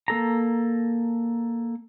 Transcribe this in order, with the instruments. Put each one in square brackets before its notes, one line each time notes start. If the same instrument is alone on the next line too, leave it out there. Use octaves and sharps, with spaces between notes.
[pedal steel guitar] A#3 A4 A#5